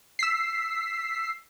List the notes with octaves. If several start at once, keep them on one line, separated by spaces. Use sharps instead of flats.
E6 B6 C7